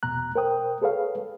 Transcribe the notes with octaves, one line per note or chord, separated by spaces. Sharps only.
E2 B2 A#5 F#6
A#4 C5 G5 D#6
G#4 A4 B4 C#5 F5